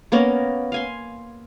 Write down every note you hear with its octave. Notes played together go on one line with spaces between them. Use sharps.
A#3 B3 C#4 A#4
F5 G#5 C6